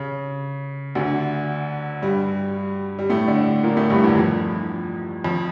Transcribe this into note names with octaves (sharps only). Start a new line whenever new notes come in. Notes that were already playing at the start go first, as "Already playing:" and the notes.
Already playing: C#3
D2 D3
G2 G3
G3
A2 A3
D3 D4
A#2 A#3
A2 A3
G2 G3
E2 E3
F2 F3
F2 F3